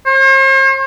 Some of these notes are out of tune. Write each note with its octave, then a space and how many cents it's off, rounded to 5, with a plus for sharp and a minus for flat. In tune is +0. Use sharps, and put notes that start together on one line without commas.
C5 +45